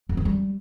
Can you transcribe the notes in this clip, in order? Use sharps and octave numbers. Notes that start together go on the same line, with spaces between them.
F2
D#3
G3